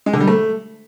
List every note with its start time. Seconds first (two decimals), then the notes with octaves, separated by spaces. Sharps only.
0.06 G#3
0.13 D3
0.20 G3
0.27 A3